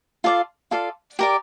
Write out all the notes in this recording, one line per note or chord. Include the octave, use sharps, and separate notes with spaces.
F4 A4 D5 F5
F4 A4 D5 F5
G4 A#4 D5